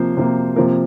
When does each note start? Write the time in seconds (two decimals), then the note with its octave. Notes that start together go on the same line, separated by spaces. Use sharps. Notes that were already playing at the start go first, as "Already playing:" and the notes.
Already playing: C3 F3 A#3 C5
0.17 C3 F3 A#3
0.56 C3 F3 A#3 A#4